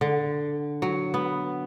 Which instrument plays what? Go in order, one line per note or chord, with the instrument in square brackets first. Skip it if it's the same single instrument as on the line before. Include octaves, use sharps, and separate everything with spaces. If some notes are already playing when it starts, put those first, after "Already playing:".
[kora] D3
F#3
B3